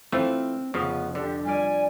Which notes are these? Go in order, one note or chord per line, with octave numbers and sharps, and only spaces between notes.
E3 A3 C4 F4 F6 F#6
F1 F2 C#3 F3 B3
D3 D4 G4
G3 F4 D5 G#5